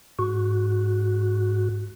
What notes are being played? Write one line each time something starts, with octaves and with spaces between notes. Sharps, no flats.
G#2 F#4